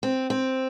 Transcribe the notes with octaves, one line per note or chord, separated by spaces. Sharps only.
C4
C4